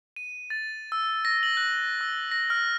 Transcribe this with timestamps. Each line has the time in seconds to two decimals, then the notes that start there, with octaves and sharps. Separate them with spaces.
0.16 D#7
0.50 A6
0.92 E6
1.25 A#6
1.43 F#7
1.57 F#6
2.01 E6
2.32 A#6
2.50 F6